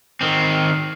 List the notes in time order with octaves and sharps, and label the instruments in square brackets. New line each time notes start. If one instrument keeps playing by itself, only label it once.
[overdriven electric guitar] D#3 C4